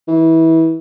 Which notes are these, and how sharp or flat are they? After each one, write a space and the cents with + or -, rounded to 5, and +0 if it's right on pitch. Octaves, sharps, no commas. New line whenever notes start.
E3 -25